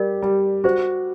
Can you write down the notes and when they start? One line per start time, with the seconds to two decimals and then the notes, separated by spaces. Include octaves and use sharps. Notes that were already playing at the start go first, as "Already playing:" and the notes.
Already playing: G3 G4 A#4 D5
0.22 G3
0.64 F#4 C5